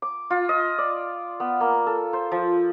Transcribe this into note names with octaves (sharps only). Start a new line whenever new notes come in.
D6
F4
D#5
D5
B3
A#3
A4
C5
F3